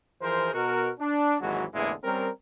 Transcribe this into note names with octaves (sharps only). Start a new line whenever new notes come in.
E3 F3 G#4 A#4 C5
B2 F#4 A#4
D4
G#1 D#2 E3 F#3 G#3 F#4
A1 E2 D3 G#3 A#3 E4
G3 C4 C#4 A#4